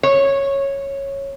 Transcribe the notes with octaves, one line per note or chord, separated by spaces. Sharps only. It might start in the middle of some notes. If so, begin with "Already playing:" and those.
C#5